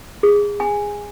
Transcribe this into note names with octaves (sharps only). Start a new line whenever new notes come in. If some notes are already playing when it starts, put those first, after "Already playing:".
G#4
G#5